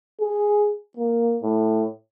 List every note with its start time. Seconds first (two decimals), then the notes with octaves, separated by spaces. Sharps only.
0.20 G#4
0.97 A#3
1.43 A2